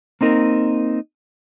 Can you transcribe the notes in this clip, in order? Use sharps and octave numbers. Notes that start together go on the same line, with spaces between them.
A#3 C4 D#4 A#4